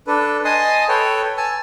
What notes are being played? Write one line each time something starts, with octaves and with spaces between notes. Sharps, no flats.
D4 A4 B4
D#5 G#5 A5 C6 D#6
A4 B4 C#5 G5
G#5 A5 E6